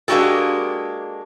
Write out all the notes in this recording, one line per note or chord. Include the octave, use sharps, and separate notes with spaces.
G#3 A#3 D4 F#4 G4 A4